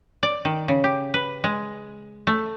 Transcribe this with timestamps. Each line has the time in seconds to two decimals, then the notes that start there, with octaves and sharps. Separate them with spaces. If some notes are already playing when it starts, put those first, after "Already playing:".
0.23 D5
0.45 D#3
0.68 C#3
0.84 G4
1.14 B4
1.44 G#3
2.27 A3